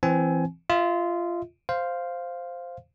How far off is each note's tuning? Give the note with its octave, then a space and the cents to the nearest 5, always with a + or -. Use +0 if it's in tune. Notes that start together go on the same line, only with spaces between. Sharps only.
E3 +20 C4 +5 G#5 +20
F4 -15 E5 -45
C5 +0 F5 +0